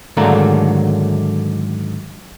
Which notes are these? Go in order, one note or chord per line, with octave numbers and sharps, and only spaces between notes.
G#2 D3 D#3 F#3 A3 A#3